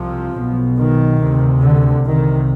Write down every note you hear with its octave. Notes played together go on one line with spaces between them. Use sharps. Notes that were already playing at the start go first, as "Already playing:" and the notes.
Already playing: C2 C3 F3
B1 B2
D#3
D2 C3
D3
C2 C3 D#3